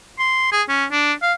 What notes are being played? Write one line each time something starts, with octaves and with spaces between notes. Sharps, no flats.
C6
G#4
C#4
D4
F5